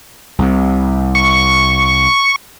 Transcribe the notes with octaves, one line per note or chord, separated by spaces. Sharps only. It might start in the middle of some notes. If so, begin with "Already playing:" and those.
C2 C3
C#6